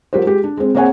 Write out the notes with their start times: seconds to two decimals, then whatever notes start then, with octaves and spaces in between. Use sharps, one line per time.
0.13 F#3 F4 G4 A#4 C5
0.25 G#3 G4
0.44 D4
0.57 G#3 C4
0.75 A#3 C4 G#4 C#5 F#5 G#5